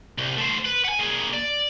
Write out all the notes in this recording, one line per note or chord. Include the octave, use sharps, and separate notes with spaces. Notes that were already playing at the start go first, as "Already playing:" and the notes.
C2
A3 C5
B4
F#5 G#5
A#3 G#4
D5